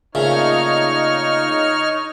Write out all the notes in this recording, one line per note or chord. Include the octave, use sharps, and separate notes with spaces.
A#2 C#3 A3 D#4 C#5 F6